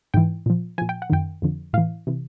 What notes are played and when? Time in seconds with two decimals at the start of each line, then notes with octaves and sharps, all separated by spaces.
0.14 G#2 E3 G5
0.46 A#2 F3
0.78 A#2 F3 G#5
0.89 G5
1.02 F#5
1.10 F#2 D#3 G5
1.42 F2 D3 F3
1.73 A2 E3 F5
2.07 C3 E3